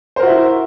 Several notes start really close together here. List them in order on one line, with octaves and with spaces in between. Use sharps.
C5 A#4 F#4 E5 E4